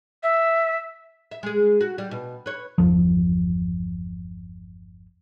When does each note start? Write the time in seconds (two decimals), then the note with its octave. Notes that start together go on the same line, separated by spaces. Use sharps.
0.23 E5
1.31 E5
1.43 G#3 G#4
1.81 F#4
1.98 G3
2.11 B2
2.46 B4 C#5
2.78 G1 E2 F3